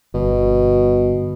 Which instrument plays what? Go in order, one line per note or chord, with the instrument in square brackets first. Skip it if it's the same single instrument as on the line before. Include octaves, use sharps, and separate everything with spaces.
[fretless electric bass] G1 [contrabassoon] B2